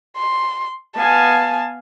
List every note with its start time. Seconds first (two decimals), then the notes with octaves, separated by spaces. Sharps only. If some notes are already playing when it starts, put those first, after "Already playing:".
0.17 C6
0.96 B3 F5 G#5 A5